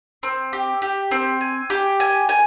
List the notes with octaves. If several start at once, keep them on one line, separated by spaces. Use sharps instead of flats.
C4
G4
G4
C4
G#5
G4
G#5
G#5